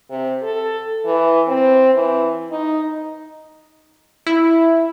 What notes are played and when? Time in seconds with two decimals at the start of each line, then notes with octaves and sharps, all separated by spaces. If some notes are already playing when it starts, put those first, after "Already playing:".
0.10 C3
0.42 A4
1.05 E3
1.47 C4
1.94 E3
2.51 D#4
4.26 E4